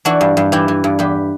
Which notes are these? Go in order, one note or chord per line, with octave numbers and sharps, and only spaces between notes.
E3 D4 F#4
G2
G2
E3 E4 G4
E3
G2
E2 G4 B4